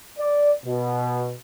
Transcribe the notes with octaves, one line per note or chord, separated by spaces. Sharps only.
D5
B2